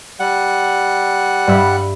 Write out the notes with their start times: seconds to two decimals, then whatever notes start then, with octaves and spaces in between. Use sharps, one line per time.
0.20 G3 F#5
1.47 G2 E5 B5